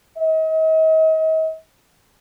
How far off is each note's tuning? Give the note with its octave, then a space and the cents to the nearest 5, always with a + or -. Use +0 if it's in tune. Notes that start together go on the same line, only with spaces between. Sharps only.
D#5 +40